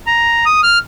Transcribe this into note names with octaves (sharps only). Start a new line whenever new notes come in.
A#5
D#6
F6